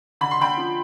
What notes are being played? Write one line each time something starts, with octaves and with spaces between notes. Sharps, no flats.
D3 B5
C6
D3 G5 B5
F3